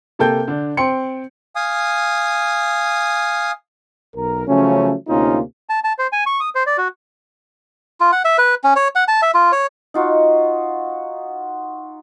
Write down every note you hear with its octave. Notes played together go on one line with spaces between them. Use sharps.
C3 A#3 A4 G5 G6
D3 D4
C4 G5 C6 C#7
F5 G#5 D#6
B1 A#4
C#3 F3 F#3 A3 C#4
D2 C3 A#3 C#4 D#4 F4
A5
A5
C5
G#5
C#6
D#6
C5
D5
F#4
F4
F#5
E5
B4
C#4
C#5
F#5
A5
E5
F4
C#5
D#4 F4 F#4